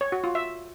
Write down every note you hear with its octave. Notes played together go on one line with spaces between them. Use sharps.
C#5
F#4
F4
E5